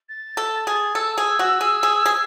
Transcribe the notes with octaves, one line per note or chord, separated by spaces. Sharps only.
A6
A4
G#4
A4 E6
G#4
F#4
G#4
G#4
G#4